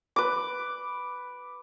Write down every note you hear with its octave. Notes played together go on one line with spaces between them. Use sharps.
B4 D6